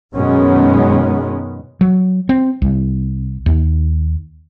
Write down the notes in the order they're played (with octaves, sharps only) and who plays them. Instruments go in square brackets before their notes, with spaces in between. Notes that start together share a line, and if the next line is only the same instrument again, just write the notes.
[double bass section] F#2 B2 D#3 G#3 B3 C#4
[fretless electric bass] F#3
C4
C2
D#2